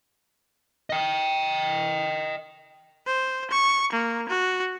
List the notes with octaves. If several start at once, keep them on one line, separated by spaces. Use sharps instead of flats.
D#5 G5
C5
C#6
A#3
F#4